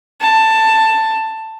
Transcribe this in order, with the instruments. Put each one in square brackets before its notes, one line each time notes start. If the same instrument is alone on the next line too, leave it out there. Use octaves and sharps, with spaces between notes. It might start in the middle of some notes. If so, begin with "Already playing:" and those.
[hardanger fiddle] A5